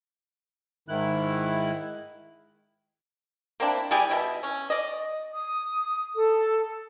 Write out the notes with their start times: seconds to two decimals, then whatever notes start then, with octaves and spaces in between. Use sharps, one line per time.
0.89 G#2 D#3 E4 F#6
3.60 A#3 C4 D4 E4
3.91 G3 E4 G4 G#4
4.10 B2 E4
4.43 C#4
4.70 D5 D#5
5.34 D#6
6.16 A4